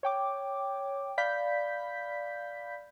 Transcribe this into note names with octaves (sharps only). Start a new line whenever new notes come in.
C#5 G5 D6
D5 F5 B5 G6 B6